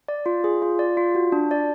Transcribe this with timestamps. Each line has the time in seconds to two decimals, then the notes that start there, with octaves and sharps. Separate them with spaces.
0.08 D5
0.26 F4
0.44 G#4
0.62 F4
0.79 D5
0.97 F4
1.15 F#4
1.32 D4
1.51 D5